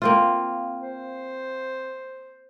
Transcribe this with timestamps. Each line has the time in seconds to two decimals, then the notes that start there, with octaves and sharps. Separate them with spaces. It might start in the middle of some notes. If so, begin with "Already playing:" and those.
0.02 A#3 C4 F4
0.80 C5